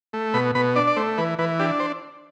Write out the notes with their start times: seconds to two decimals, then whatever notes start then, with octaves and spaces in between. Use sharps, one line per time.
0.13 A3
0.34 B2 B5
0.55 B2 B5
0.76 D4 D5
0.87 D5
0.96 A3 C5
1.18 E3 B4
1.39 E3 B4
1.59 D4 G4
1.80 C5